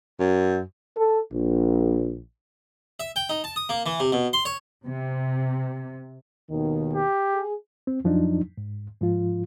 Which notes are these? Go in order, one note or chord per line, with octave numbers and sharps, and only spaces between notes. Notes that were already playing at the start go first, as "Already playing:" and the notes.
F#2
A4
A#1
E5
G5
D#4
A5
D#6
A#3
E3
C3
B2
C6
C#5
C3
D#2 B2 D#3
G4
G#4
C4
F2 F3 F#3 D4 D#4
G#2
G#2 F3 F4